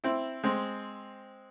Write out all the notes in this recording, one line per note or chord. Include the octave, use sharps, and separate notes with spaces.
C4 E4
G#3 C4